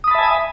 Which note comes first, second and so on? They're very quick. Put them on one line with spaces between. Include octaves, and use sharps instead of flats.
D#6 B5 A5 E5 G#5